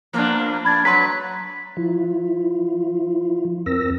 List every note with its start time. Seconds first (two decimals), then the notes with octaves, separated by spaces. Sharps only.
0.13 F3 A#3 B3 D4
0.65 D4 B5 G#6 A6
0.85 F#3 B4 A#5 C6 B6
1.77 F3 E4 F4
3.66 F2 C4 A#4 E6 A#6